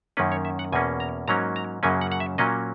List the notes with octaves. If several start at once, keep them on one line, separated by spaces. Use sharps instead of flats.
F#2 D#3 A#3 C#4 B4
C#5
E5
F#5
E2 B2 A#3 C#4 G#5
A#5
G#2 F#3 A#3 C#4 A#5
A#5
F#2 C#3 F#3 A#3 C#4 G#5
F#5
F#5
E5
A#2 F#3 A#3 C#4 D#5